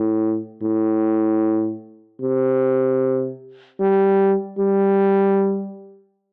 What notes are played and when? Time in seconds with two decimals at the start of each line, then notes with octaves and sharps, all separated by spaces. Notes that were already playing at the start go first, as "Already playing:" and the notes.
Already playing: A2
0.63 A2
2.22 C3
3.80 G3
4.59 G3